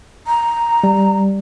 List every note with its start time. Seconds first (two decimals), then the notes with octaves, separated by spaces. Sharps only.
0.27 A#5
0.84 G3